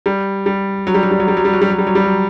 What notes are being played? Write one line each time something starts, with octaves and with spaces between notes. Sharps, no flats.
G3
G3
F#3
G3
F#3
G3
F#3
G3
F#3
G3
F#3
G3
F#3
G3
F#3
G3
F#3